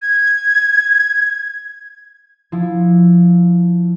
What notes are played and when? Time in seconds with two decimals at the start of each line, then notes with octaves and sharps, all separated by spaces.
0.02 G#6
2.52 F3 E4